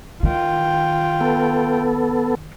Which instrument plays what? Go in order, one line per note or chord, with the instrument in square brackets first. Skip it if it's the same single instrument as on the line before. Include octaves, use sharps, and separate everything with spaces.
[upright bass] D#3 [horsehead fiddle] F4 G5
[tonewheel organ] B3 A4